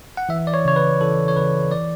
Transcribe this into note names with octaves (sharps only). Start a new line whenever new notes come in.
F#5
E3 E5
D5
C#5
C#3 C#5
B4
E3 A4
C#5
C#3 B4
E3 D5